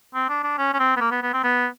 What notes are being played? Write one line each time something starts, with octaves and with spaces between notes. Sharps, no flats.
C4
D4
D4
C#4
C#4
C4
B3
A#3
B3
B3
C4
B3